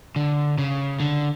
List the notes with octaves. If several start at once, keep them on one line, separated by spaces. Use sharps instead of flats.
D3
C#3
D3